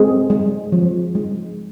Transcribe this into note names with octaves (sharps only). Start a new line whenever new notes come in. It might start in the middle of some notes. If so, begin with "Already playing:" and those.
Already playing: G#3 C4 G#4
G#3
F3
G#3